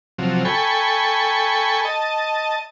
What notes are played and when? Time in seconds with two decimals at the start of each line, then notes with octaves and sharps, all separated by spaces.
0.19 C3 F3 F#3
0.45 A4 G5 G#5 B5 C#6
1.85 D#5 A5